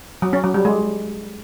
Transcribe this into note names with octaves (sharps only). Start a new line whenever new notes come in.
F#3
C#4
F#3
G3
G#3